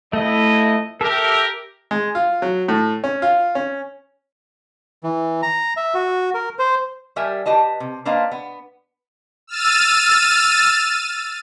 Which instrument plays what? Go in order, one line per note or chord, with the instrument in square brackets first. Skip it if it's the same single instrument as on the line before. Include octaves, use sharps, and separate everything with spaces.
[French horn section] F2 D#5 [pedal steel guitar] A3 E4
[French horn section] G4 A#4 [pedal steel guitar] A4 E5
[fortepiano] G#3
F4
F#3
A2
C#4
F4
C#4
[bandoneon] E3
A#5
E5
F#4
A#4
C5
[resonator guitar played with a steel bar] G3 G4 A#4 E5 G#5
G4 B4 D#5 A5
C3
A#3 D4 B4 C5 D#5 F5
B3
[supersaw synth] E6 F6 A6 D#7